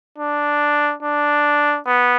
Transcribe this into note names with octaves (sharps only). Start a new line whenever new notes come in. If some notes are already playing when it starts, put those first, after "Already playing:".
D4
D4
B3